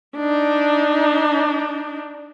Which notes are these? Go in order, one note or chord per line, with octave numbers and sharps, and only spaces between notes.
D4 D#4